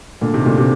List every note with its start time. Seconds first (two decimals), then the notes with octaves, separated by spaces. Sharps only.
0.21 A#2 D3
0.34 C3 D#3
0.45 A#2 D3
0.58 C3